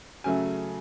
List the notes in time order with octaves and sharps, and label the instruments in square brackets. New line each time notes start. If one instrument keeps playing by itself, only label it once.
[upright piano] C#3 F#3 A3 G#5